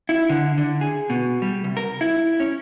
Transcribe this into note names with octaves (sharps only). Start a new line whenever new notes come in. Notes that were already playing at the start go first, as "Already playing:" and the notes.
E4
D3
D3
G#4
B2
G3
C2
A#4
E4
C#4